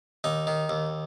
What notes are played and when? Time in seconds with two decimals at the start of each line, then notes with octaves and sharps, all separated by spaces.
0.24 D#2 D#4
0.47 D#3
0.69 D#2